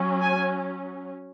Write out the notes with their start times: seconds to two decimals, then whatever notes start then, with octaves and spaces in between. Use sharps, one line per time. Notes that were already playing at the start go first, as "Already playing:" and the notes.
Already playing: F#3 C#4
0.21 G#5